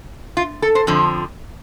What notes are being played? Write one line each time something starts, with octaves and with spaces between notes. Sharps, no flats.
F4
A4
C5
F2 D3 F3